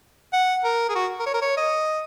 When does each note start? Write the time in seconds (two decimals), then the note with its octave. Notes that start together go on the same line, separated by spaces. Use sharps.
0.33 F#5
0.64 A#4
0.89 G#4
0.95 F#4
1.19 A#4
1.26 C#5
1.34 A#4
1.42 C#5
1.57 D#5